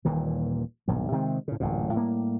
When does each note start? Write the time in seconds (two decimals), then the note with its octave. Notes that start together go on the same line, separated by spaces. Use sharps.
0.05 D#1 D#2 A#2 E3
0.88 D#1 B1 G2
1.12 C3 D#3 G#3 C4
1.48 A2 C#3
1.60 D1 A1 F#2 A#2
1.93 A2 G3 A#3